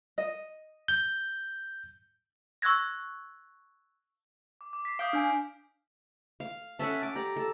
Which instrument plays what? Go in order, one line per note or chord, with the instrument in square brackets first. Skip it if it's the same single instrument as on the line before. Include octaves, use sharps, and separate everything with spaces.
[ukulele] D#5
[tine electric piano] G6
[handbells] C#6 E6 F#6 G#6 A#6
[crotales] D6
D6
B6 C7
[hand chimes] F5 D6 [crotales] D#6 G6 D7
[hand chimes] D4 G#5 [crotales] F6 G6
[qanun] F5
[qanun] C#4 A4 F#5 [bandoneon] E5 A5
[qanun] D6
[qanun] G4 D5 [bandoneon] A#5
[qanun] A4